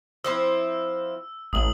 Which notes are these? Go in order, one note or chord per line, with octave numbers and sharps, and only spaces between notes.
F3 C4 E4 E6
A1 D#6 F#7